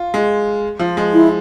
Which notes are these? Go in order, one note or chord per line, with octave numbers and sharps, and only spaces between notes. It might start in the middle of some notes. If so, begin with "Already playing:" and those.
Already playing: F4
G#3
F3
G#3
E4